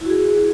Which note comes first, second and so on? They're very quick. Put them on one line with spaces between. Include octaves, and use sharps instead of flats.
E4 F#4 G#4